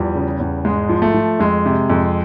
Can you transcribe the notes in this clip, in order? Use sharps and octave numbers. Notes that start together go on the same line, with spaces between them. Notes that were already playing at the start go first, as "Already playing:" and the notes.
Already playing: E2 F3 G3
C#3
E2
G#2 G#3
F3
A3
F3
F2 G#3
C3
F2